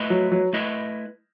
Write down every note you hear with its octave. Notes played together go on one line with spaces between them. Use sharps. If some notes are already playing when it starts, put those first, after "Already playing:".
Already playing: A3 E4 B4 D#5
F#3
F#3
A3 E4 B4 D#5